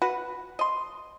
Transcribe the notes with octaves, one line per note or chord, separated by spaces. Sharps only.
F#4 B4 F#5
D#5 C6